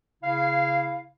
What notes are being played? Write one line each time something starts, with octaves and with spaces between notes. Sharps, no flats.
C#3 E4 F5